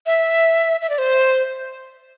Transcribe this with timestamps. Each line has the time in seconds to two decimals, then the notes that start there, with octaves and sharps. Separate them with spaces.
0.06 E5
0.82 E5
0.90 D5
0.98 C5